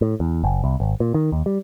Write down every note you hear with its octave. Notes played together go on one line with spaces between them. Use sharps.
A2
E2
F#1
C2
G#1
A#2
D#3
D#2
G3